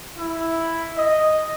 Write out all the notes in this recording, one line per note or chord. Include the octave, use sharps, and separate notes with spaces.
E4
D#5